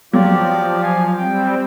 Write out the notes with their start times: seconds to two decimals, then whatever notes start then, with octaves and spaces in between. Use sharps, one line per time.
0.13 F3 F#3 F4 G4 D5
0.83 F5 G#5
1.17 G3 C4 G5